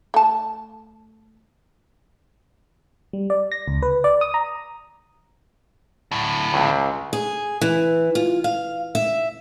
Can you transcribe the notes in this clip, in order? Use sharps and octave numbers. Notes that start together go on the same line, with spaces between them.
A3 A5
G3
D5
A#6
C#2
B4
D5
D#6
A#5
D2 A2
C#2
G#4
E3
F4
F5
E5